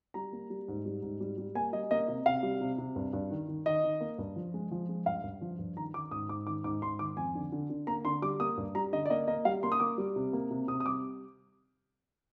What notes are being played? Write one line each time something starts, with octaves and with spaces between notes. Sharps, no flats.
G3 A#5
A#3
G3
G#2
G3
G#2
G3
G3
A#3 G#5
G3 D#5
A#3 D#5
C3 D#5
C3 F5
G3
C3
C3
G2
G2
D#3
D#3
D#3 D#5
D#3
A#3
G2
F3
G#3
F3
G#3
G2 F5
G2
F3
G2
D#3 A#5
D#3 D6
G#2 D#6
G#2 D6
D#3 D6
G#2 D6
G#2 C6
D#3 D6
F2 G#5
D3
D3
D3
A#3 A#5
D3 C6
G3 D6
A#3 D#6
G2
G3 A#5
D3 D#5
D5
A#3 D#5
A#3 D#5
G3 F5
A#3 C6
D#6
A#3 D6
G3
C3
A#3
C3
C3 D#6
D#6
G3 D6